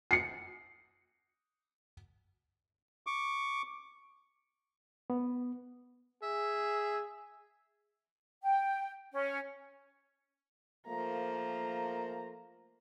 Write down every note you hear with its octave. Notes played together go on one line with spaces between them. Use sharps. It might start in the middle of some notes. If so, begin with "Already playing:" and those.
C7 C#7
C#6 D6
B3
G#4 E5
G5
C#4
F3 A3 A#3 A#5